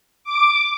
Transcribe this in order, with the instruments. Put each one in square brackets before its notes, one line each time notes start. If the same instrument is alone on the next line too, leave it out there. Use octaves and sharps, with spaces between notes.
[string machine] D6